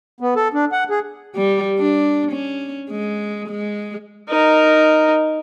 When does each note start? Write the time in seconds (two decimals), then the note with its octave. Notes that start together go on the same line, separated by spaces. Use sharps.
0.20 B3
0.36 A4
0.54 D4
0.72 F#5
0.90 G#4
1.35 G3
1.79 D4
2.32 C#4
2.91 G#3
3.48 G#3
4.29 D#4 A#4